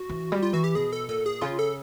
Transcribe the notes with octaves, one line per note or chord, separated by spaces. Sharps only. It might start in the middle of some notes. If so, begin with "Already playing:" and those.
Already playing: F#4
E3
G3
F4
E3 F#4
G4
B2 G#4
A4
A#2 A4
G#4
C#3 F4
A4